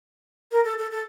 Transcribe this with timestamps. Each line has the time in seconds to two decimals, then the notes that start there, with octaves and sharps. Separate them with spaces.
0.51 A#4
0.64 A4
0.78 A4
0.91 A4